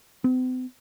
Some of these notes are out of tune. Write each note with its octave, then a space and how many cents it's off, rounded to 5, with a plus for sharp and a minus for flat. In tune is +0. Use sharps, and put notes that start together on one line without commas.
C4 -45